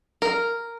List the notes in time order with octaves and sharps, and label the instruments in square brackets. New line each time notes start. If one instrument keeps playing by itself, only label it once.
[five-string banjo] A#4